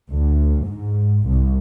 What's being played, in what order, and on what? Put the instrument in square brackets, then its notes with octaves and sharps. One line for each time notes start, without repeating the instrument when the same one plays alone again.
[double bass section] D2
G#2
C2